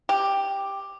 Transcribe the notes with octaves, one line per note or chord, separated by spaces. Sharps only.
G4